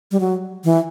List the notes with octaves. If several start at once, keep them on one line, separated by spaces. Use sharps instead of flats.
G3
F#3
E3